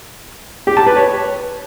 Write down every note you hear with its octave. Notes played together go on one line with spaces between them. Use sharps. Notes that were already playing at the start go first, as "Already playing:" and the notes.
G4
A5
B4
C#5